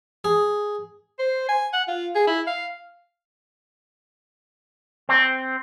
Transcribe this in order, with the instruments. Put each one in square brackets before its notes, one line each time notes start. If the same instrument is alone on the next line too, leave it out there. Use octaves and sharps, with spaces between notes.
[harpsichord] G#4
[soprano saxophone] C5
G#5
F#5
F4
G#4
E4
F5
[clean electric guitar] C4